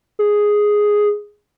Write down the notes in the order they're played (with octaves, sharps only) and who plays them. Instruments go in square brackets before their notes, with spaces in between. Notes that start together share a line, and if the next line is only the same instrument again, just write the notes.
[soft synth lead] G#4